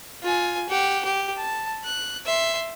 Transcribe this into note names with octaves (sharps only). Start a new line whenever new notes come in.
F4 G#5
G4 F#5
G4
A5
F#6
E5 C6